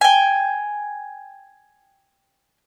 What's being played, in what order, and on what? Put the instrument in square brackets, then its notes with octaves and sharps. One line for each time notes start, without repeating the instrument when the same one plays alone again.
[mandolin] G5 G#5